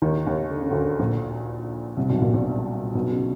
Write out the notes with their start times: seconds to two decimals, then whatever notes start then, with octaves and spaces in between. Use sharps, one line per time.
0.02 D#2 D#3
0.27 D#2 D#3
0.50 D3
0.61 C#3
0.71 D2 D3
0.99 A#1 A#2
1.97 C2 C3
2.09 B1 B2
2.21 A#1 A#2
2.34 A#1 A#2
2.95 B1 B2
3.11 C#3